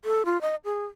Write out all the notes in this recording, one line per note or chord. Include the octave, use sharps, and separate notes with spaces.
A4
F4
D#5
G#4